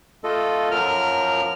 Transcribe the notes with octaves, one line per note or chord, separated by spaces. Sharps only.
A3 F4 A4 D#5
F#2 F3 F#3 A#4 F6